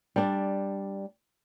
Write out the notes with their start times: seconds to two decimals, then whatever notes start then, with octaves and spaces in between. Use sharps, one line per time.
0.16 G3 D4